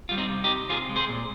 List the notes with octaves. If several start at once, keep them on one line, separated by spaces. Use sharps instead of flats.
G3 F4
C4 D#4
C3
D#4 G4
C3
C4 F4 G#4
G#3
G#4 C5
A#2